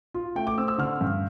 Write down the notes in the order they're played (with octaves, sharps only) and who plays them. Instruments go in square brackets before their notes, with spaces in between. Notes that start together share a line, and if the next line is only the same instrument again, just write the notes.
[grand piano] F4
A3 G5
D6
C4 E6
E6
D3 F6
G2